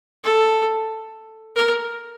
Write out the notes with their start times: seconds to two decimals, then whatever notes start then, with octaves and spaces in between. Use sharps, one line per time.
0.24 A4
1.56 A#4